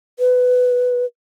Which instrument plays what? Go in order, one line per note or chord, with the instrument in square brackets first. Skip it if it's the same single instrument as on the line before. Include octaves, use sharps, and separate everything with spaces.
[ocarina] B4